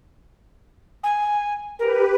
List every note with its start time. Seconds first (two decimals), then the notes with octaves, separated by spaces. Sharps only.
1.03 G#5
1.79 G4 A#4 B4